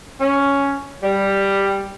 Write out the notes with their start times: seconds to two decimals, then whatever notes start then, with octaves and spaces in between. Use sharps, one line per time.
0.21 C#4
1.03 G3